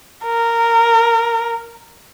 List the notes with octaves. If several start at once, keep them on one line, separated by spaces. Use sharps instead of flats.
A#4